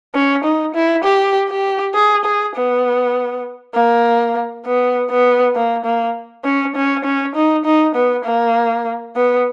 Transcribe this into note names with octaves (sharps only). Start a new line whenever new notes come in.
C#4
D#4
E4
G4
G4
G#4
G#4
B3
A#3
B3
B3
A#3
A#3
C#4
C#4
C#4
D#4
D#4
B3
A#3
B3